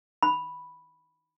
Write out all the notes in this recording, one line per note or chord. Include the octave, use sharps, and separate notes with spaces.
B5